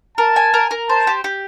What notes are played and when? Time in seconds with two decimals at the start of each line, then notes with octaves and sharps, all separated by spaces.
0.18 A#4 A5
0.36 G#5
0.54 A#4
0.71 A#4
0.89 C5 A5
1.07 G4
1.24 G4